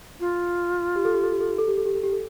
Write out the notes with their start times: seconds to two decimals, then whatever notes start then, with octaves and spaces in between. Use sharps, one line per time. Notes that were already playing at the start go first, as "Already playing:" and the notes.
0.20 F4
0.96 G4
1.05 A4
1.14 G4
1.23 A4
1.32 G4
1.41 A4
1.50 G4
1.58 A4
1.68 G4
1.77 A4
1.86 G4
1.95 A4
2.03 G4
2.12 A4